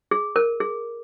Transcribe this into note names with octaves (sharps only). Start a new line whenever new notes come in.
G#4
A#4
G#4